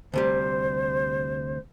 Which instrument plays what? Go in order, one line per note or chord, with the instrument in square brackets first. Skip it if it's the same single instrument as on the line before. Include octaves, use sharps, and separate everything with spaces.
[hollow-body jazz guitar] D2 C3 G3 [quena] C5